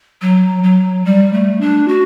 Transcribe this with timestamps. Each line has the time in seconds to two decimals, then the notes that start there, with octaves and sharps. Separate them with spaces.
0.22 F#3
0.63 F#3
1.05 G3
1.33 A3
1.61 D4
1.88 F#4